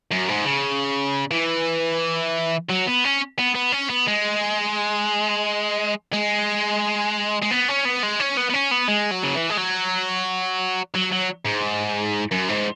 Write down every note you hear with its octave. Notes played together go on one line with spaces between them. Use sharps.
F#2
G#2
C#3
E3
F#3
B3
C#4
B3
B3
C#4
B3
G#3
G#3
G#3
B3
C#4
B3
G#3
C#4
B3
B3
C#4
B3
G#3
F#3
C#3
E3
G#3
F#3
F#3
F#3
G#2
F#2
G#2